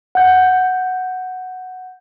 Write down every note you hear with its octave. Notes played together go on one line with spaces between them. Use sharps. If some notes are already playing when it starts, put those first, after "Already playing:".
F#5 G6